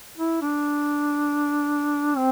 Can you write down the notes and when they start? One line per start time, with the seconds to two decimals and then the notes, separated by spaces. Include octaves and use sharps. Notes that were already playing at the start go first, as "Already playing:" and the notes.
0.17 E4
0.42 D4
2.17 C4